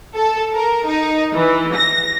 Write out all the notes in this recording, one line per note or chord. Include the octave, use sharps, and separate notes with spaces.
A4
A#4
D#4
E3
A#6